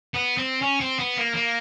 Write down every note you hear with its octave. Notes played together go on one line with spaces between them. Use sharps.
B3
C4
C#4
C4
B3
A#3
A#3